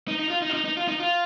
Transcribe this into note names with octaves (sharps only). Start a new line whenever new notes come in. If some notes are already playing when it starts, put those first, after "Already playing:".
D#4
D#4
F4
D#4
F4
D#4
D#4
F4
D#4
F4